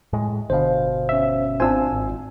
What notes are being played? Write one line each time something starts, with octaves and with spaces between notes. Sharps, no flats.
A2 G#3
G1 B2 D3 C5 F5
C#4 E5
G#1 C4 D4 F4 C5 G#5 E6
G#1